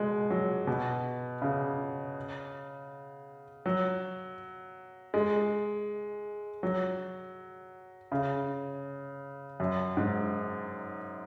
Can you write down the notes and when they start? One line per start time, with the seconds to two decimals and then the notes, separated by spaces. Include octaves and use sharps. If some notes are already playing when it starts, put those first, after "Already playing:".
Already playing: B2 G#3
0.30 F#3
0.67 B2
1.42 C#3
3.66 F#3
5.14 G#3
6.63 F#3
8.12 C#3
9.60 F#2
9.97 G#2